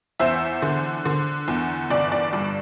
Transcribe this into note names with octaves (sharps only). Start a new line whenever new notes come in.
E2 C5 E5
D3
D3
E2
G1 D5
D5
G2 D5